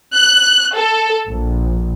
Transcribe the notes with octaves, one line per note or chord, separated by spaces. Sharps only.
F#6
A4
A#1